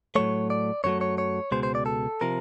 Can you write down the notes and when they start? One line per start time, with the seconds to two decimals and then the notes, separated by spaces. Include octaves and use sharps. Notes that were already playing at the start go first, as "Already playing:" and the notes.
0.15 A2 F#3 A3 C#5
0.50 D5
0.84 F#2 D3 F#3 A3 C#5
1.01 C#5
1.18 C#5
1.51 C#2 B2 G#3 C5
1.63 C5
1.75 D5
1.86 A4
2.21 C3 F3 A#4